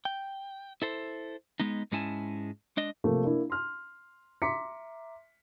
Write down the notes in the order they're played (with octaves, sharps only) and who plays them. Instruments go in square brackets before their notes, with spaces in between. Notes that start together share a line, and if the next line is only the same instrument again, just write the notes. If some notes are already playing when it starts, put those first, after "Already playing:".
[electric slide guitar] G5
E4 A4 C5
G#3 B3 D#4
G#2 G#3 C#4 E4 G#5 A5
G#3 D4 D#5
[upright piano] C3 F3 A3 A#3
A#3 D4 E4
C6 F6
E5 A#5 C6 D6 B6 C#7